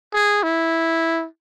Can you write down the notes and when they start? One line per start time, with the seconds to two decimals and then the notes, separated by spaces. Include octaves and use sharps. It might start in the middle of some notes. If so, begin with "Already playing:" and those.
0.13 G#4
0.43 E4